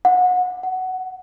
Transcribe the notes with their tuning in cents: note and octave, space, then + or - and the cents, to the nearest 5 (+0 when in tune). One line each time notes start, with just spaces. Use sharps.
F#5 -25
F#5 +10